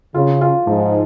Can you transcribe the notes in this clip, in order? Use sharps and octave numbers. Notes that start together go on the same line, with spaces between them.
C#3 F4
F4
G#2 F3